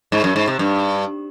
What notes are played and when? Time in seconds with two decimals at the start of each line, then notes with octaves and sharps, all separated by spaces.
0.12 G#2
0.24 F#2
0.36 G#2
0.48 C3
0.59 G2